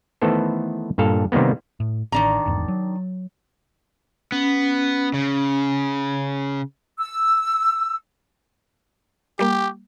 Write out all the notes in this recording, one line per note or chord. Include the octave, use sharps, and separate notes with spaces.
D#3 E3 A3 B3 A4 C5
G2 A#2 A4 F5
C3 D#3 G3 A#3 B3
A2
A1 D#3 D4 A#5
G1 E2 G#2
F#3
B3 C#4
C#3
E6
G3 A#3 G4